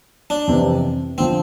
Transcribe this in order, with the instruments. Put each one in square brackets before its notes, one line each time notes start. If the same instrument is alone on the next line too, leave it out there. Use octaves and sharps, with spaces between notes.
[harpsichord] D4
[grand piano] F2 C3 E3
[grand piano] D3 F3 [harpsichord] C4